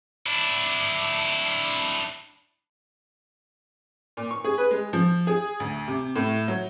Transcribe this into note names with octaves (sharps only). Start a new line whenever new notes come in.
D4 E4
A#2
C#6
G#4
B4
G#3
F3
G#4
D2
C3
A2
F#3